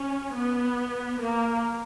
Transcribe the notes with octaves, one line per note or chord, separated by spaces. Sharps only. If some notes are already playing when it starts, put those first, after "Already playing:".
Already playing: C#4
B3
A#3